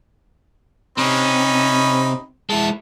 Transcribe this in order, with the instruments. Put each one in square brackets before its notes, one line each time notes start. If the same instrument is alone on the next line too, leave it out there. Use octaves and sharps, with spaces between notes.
[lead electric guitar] C3 [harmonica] C#4 D#4 B5
[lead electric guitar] G#3 E4 [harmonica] A5